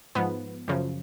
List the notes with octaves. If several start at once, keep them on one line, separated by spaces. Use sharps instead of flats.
G#2 F3 B3
F#2 C#3 F3